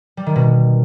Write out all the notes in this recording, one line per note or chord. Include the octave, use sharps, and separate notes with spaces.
G3
D#3
B2